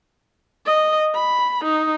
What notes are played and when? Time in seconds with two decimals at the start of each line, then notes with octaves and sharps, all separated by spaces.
0.66 D#5
1.14 B5
1.65 D#4